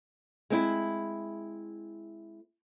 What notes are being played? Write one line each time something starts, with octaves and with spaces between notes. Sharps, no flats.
G#3 C4 E4